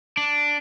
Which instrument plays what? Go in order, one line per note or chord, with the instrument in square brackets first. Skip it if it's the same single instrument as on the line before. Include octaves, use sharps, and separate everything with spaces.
[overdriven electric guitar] D4